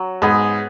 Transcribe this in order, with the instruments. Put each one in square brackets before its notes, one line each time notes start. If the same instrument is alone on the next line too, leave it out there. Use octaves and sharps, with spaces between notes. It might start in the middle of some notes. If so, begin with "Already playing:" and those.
Already playing: [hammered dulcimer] F#3
[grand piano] G#2 [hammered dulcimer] B3 G#4